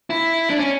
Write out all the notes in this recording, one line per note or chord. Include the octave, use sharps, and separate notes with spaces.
E4
D4
C#4